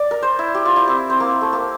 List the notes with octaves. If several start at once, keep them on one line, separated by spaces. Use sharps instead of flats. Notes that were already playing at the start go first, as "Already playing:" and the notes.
Already playing: D5
A#4
C5
E4
G4
F4
E4
C4
C4
A#3
A3
A#3